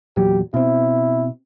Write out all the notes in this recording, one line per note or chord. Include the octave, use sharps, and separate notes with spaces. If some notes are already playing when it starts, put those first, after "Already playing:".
E2 A#2 F#3 G4
B2 C4 E4